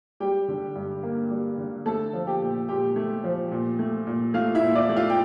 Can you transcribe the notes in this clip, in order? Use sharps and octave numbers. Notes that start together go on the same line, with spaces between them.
G3 G4 G5
D3
G2
A#3
G3
D3
A3 A4 A5
F3
G4 G5
A#2
A#2 G4 G5
A3
F3
A#2
A3
A#2
A3 F4 F5
E4 E5
A#2
D5
A3
F4 F5
G5